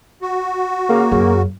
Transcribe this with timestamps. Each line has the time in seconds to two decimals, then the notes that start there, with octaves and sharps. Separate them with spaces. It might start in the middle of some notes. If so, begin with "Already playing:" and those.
0.22 F#4
0.89 C#3 A#3
1.12 F#2 C#3